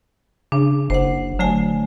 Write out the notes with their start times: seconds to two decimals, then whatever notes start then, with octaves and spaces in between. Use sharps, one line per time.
0.52 C#3 D4
0.90 F#1 C5 F#5
1.39 D3 F#3 A3 G#5